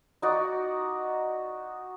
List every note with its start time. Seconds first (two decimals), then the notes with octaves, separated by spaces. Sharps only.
0.22 D#4 F#4 D5